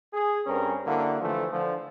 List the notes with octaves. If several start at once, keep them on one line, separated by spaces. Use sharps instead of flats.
G#4
G2 C4 C#4 A#4
D3 A#3 E4 F#4
D3 E3 F3 A3
D3 F3